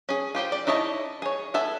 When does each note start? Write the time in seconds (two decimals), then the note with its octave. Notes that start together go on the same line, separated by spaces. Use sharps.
0.09 C#4 G#4
0.35 F4 G4 C5 G5
0.52 D5
0.67 D#4 E4 C#5 D#5 A5
1.22 G#4 C#5
1.54 B3 A4 E5 G#5